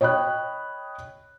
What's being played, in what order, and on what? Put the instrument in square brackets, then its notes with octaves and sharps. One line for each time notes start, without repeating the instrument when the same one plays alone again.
[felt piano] C#5 D#5 G5 B5 F#6